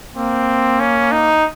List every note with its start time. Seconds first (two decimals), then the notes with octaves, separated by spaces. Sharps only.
0.16 A#3 C4
0.80 C#4
1.12 D#4